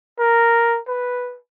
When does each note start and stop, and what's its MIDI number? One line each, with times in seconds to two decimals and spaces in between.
0.19 0.79 70
0.88 1.37 71